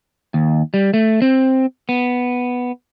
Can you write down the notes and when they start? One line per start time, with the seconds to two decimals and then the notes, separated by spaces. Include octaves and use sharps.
0.34 D#2
0.74 G3
0.94 A3
1.22 C4
1.89 B3